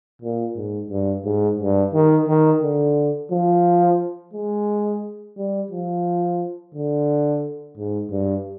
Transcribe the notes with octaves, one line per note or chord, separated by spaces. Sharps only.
A#2
G#2
G2
G#2
G2
D#3
D#3
D3
F3
G#3
G3
F3
D3
G#2
G2